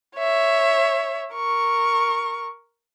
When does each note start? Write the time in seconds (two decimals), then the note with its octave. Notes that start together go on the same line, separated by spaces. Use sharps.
0.18 C#5 E5
1.34 A#4 C#6